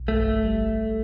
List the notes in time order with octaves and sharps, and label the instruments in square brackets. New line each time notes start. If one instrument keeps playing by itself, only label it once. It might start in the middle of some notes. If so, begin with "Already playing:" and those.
Already playing: [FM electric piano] B1
[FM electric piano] G1 [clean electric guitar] A3
[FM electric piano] G3